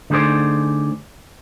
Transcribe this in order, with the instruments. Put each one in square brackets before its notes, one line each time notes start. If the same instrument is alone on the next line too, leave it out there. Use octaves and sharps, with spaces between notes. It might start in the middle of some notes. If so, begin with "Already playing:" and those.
[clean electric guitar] D3 A3 D#4 G#4 C5 D5